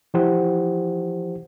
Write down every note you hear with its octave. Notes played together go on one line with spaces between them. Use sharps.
E3 F3 E4 G4 C5 F#5